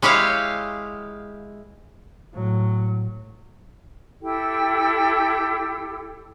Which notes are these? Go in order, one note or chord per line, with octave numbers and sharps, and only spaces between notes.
G#3 E4 G4 C#5 F5
A2 F#3
E4 G4 A4 G5